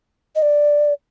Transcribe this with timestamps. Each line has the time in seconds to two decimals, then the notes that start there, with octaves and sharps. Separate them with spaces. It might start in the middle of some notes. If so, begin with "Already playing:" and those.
0.36 D#5
0.42 D5